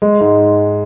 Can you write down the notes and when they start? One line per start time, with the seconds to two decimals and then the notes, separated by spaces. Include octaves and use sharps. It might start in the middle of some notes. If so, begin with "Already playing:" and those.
0.02 G#3
0.21 G#2